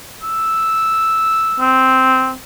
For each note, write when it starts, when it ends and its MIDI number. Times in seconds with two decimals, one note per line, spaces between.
0.23 1.78 88
1.60 2.34 60